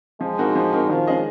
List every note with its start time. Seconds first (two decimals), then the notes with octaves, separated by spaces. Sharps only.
0.20 F3 G#3
0.38 C4 D#4 F#4 A#4
0.55 F3
0.73 C4 D#4 F#4 A#4
0.90 D#3 F3
1.07 G#3 C#4 G#4 D#5